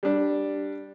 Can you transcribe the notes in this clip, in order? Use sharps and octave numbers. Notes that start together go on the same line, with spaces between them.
G3 D4